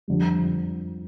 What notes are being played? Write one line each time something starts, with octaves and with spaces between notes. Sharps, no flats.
F2 D3 G3